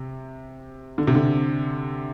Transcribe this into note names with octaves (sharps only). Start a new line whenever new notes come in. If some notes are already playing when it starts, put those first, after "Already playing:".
Already playing: C3
D3
C3
D3